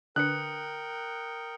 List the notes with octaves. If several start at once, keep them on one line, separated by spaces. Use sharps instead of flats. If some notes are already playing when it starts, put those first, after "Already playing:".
D3 D4 A#4 B4 G5 D#6 F#6 C#7